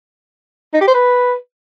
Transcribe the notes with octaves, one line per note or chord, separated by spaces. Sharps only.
D#4
G4
C5
B4